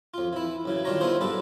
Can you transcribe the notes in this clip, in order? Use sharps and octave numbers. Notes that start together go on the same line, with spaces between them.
F2 F4
E3 E4
F#2 C#3 E3
D#3 G3 D4 F4 C#5 A#5
B3 E4 F4 G#4 C5
B1 G2 D4 A4 B4